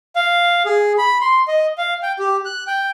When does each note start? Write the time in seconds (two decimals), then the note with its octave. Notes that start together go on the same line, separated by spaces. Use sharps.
0.16 F5
0.65 G#4
0.98 B5
1.21 C6
1.48 D#5
1.78 F5
2.03 G5
2.19 G4
2.45 F#6
2.67 G5